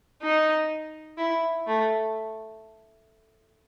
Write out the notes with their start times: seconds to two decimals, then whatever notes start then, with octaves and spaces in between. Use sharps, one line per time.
0.22 D#4
1.18 E4
1.67 A3